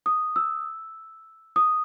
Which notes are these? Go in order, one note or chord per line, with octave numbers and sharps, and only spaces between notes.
D#6
E6
D#6